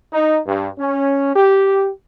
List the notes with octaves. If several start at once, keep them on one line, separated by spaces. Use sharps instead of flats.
D#4
G2
C#4
G4